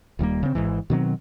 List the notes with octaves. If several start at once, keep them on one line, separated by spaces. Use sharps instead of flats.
D#1 D#2 G3 A#3
C#3 C4
G#1 C#2 G#2 E3
B2 D#3 F#3 C4